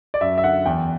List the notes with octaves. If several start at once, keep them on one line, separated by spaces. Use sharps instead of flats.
D5
F#2 E5
E5
D3 F#5
E2 G5